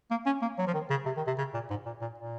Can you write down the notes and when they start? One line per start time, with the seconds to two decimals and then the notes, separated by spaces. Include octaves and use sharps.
0.11 A#3
0.26 C#4
0.42 A#3
0.58 F#3
0.67 F3
0.74 D#3
0.90 C#3
1.06 C3
1.17 D#3
1.27 C3
1.38 C#3
1.54 A#2
1.70 G#2
1.86 A#2
2.01 A#2
2.18 A#2